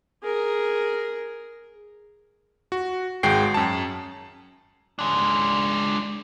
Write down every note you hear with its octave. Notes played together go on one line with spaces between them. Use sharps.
G#4 A#4
F#4
G#1 G#3 F#4 G5 C7
F#2 A5
G#3 D4